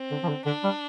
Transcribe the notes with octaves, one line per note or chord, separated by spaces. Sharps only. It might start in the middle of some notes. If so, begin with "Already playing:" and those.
Already playing: C4
D3
F3
D3
D3 D4
G3